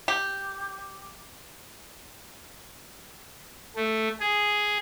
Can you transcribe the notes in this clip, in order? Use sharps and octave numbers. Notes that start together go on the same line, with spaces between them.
G4
A3
G#4